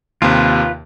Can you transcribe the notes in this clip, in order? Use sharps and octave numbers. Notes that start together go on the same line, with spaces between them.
D#2 C3 F4 B4